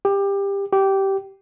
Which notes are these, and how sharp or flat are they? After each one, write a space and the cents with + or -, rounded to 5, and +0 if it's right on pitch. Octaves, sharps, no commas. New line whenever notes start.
G4 +20
G4 -15